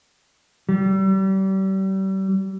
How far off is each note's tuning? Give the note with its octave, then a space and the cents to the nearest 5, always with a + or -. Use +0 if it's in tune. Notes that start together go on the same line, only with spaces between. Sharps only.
G3 -35